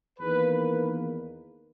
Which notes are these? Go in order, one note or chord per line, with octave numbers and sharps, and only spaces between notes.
E2 D#3 A#3 B4
B4